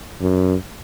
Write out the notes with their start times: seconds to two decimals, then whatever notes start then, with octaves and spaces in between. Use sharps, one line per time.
0.21 F#2